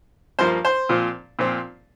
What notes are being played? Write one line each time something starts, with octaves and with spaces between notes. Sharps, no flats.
G2 F3 A#3 C5
C5
A#2 F3 C4
A#2 F3 C4